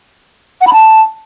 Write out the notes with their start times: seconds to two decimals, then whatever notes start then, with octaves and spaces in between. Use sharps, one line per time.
0.61 F#5
0.67 B5
0.73 A5